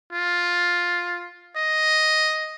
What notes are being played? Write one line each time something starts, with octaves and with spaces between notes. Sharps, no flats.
F4
D#5